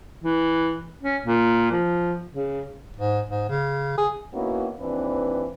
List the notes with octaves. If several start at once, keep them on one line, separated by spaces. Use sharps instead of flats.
E3
C#4
A#2
F3
C#3
G#2
G#2
C#3
G#4
A#3 B3 C#4 D#4 E4 F#4
D#2 E3 C4 D4 B4